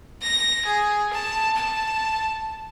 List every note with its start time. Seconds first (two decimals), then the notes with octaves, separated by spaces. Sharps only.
0.22 A#6
0.66 G#4
1.13 A5
1.56 A5